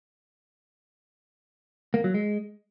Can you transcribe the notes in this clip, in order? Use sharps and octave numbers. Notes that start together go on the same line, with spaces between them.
A#3
F#3
G#3